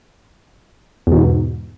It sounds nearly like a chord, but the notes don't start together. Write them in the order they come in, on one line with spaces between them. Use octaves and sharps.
E2 B2 G#2